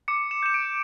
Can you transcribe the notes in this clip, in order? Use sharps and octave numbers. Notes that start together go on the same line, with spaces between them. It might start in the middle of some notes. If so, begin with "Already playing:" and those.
D6 C#7
E7
G6 E7
D7